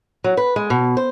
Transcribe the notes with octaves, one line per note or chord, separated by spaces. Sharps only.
F#3
B4
G#3
B2
C5